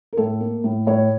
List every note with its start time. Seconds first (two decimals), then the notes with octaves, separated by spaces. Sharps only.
0.13 A#4
0.17 A2 A4
0.41 A#3
0.64 A2
0.87 A2 C#5